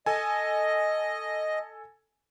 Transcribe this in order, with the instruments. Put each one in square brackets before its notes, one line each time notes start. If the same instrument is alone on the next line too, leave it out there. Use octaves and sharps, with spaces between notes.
[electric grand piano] A4 G#5 [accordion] D#5